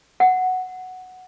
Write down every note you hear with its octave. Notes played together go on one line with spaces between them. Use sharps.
F#5